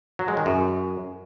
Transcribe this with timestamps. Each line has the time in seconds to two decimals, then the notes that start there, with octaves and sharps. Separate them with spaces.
0.19 F#3
0.28 G#3
0.37 D#3
0.46 F#2